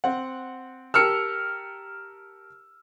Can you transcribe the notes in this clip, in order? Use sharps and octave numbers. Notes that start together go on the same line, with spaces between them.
C4 F#5
G4 A#4 A5 E6 F6 C#7